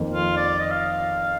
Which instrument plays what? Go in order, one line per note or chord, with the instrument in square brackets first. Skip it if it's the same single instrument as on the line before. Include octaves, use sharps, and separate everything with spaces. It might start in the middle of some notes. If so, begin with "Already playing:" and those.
Already playing: [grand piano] F2 D#3 A#3 D#4
[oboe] F4
D5
D#5
F5